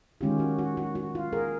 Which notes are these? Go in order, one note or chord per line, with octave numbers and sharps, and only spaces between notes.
D#3 G#3 C#4 F4 G4
F#4
F#4
F#4
F#4
F4
G#4 A#4